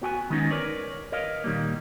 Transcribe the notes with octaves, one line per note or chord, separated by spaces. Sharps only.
B3 F#4 G5 G#5
D#3 G#3 B3 C#4 D#4
A#4 B4 C#5 D5
A#4 B4 C#5 D#5 F5
A#2 D#3 G3 A#3